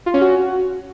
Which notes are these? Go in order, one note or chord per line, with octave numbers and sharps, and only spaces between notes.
F4
C#4
F#4